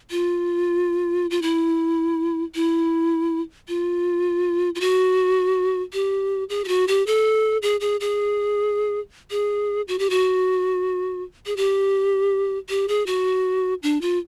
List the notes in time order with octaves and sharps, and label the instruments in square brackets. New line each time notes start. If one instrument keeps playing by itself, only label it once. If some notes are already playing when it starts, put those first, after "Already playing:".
[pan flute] F4
F4
E4
E4
F4
F4
F#4
G4
G#4
G4
F#4
G4
A4
G#4
G#4
G#4
G#4
F#4
G4
F#4
G#4
G4
G4
G#4
F#4
D4
F4